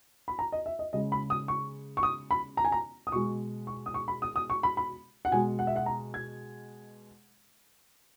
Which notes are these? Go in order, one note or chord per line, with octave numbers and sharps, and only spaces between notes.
B5
A#5
D#5
E5
D#5
C#3 G#3 D#5
B5
D#6
C#6
C#6
D#6
B5
A#5
G#5
A#5
D#6
B2 G#3 C#6
C#6
D#6
C#6
B5
D#6
D#6
C#6
B5
B5
F#5
B2 G#3 G#5
F#5
E5
F#5
A#5
G#6